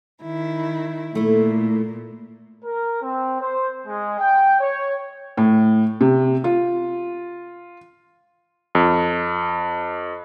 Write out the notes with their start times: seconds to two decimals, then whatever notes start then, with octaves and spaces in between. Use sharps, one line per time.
0.23 D#3 E4
1.15 A#2 A3 E4
2.64 A#4
3.02 C4
3.40 C5
3.87 G#3
4.18 G5
4.60 C#5
5.37 A2
6.01 C3
6.44 F4
8.75 F2